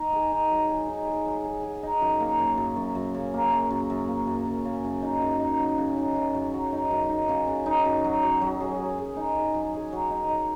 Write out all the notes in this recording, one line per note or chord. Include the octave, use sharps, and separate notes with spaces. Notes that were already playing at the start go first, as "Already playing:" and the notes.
Already playing: D#4
G#4
D#4
F#3
G#4
D#4
G#4
F#3
G#4
G#4
D#4
F#2
A#3
F#2
F#2
F#2
F#2
C#3
A#3
F#2
F#2
F#2
A#3
F#2
F#2
C#3
F#2
D#4
F#2
D#4
F#3
C#3
D#4
F#2
F#2
F#3
D#4
F#2
D#4
C#3
C#3
D#4
F#2
F#3
F#3
F#3
G#4
G#4
G#4
D#4
G#4
F#3
G#4
F#3
D#4
D#4